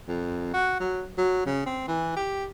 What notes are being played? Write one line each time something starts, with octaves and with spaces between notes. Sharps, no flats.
F2
F#4
F#3
F#3
C#3
C4
E3
G4